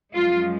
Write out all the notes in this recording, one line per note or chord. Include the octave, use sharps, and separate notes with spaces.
F#2 F3 G#3 F4